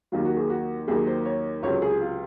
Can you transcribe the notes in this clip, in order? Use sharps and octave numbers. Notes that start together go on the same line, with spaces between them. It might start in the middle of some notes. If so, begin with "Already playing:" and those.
D#2 D#3 F#3 F4
F#4
G#4
F#4
D#2 D#3 F#3 G#4
C5
C#5
C#2 C3 F#3 C#5
G#4
F4